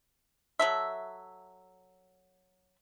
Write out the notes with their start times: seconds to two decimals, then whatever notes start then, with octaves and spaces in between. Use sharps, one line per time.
0.59 F#3 A4 E5